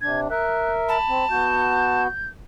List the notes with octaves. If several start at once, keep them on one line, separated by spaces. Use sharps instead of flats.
C3 D4 G#6
A#4 E5 F#6
A5 B5
C4
B3 F#4 G6